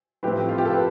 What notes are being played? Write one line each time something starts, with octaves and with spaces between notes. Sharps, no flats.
A2 F3 A3 C4 G4 B4
F4
G4
A4
B4